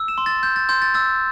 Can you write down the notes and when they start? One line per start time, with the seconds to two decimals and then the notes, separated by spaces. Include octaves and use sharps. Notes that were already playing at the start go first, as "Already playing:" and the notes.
Already playing: E6
0.08 E7
0.18 C6
0.26 A6
0.43 G6
0.56 A6
0.69 C6 G6
0.82 A6
0.94 E6 A6